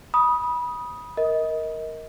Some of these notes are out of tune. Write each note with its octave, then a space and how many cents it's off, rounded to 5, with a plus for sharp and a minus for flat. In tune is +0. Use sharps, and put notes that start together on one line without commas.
B5 -25 D#6 +5
A#4 +0 D#5 +25